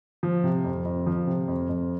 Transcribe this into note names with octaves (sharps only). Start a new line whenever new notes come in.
F3
C3
F2
F2
F3
C3
F2
F2